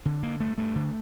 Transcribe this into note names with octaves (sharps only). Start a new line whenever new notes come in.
D3 C4
D3 A#3
G2 A3
G2 A3
D3